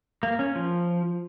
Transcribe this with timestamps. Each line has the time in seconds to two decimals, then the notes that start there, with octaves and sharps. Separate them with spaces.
0.23 A#3
0.39 C#4
0.56 F3